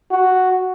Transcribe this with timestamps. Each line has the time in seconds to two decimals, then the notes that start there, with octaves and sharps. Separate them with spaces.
0.11 F#4